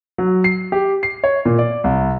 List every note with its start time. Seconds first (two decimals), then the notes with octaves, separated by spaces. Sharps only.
0.18 F#3
0.44 C7
0.72 G4
1.03 C7
1.24 C#5
1.45 A#2
1.59 D5
1.84 C2